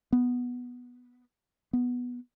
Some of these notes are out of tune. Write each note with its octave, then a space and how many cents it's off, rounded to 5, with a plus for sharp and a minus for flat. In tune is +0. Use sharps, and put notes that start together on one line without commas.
B3 -5
B3 -5